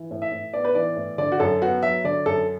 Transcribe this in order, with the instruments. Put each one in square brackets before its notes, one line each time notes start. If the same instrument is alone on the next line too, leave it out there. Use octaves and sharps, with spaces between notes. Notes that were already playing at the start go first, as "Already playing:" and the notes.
Already playing: [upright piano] E3
A2
E5
A2
B3 D5
B4
E3 D5
A2
D3 D5
F#4
F#2 A4
B3 F#4
F#3 E5
D3 D5
F#2 A4